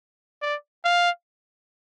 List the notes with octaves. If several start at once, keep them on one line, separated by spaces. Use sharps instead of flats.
D5
F5